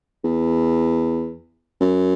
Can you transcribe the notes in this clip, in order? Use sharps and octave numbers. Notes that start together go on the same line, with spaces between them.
E2
F#2